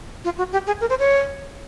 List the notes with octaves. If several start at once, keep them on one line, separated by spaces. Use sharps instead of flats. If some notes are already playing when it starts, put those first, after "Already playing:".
F4
F#4
G4
G#4
A#4
C5
C#5